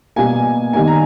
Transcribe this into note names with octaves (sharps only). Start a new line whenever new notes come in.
B2 G3 A#3 G#5
D#3 G3 A#3 G#5
A#5